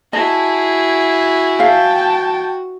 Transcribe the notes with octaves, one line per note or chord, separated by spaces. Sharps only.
E4 F#4 G#4 D#5 A5
E5 F5 G5 A5